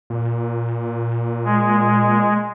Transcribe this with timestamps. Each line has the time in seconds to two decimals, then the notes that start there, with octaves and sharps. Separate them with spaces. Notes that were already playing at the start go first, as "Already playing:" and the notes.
0.10 A#2
1.45 G#3